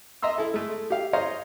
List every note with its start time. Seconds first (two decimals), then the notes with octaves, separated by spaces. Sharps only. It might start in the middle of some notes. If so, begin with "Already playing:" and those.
0.22 D#5 E5 A#5 C6 E6
0.38 E4 A4
0.54 G#3 A3
0.90 G4 F5
1.13 C5 C#5 D#5 F5 A#5 C6